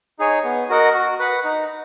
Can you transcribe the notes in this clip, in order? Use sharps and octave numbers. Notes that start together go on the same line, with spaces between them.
D#4 G#4 C#5 G#5
B3
F#4 A#4 D#5 F#5
F#4
B4 F#5
D#4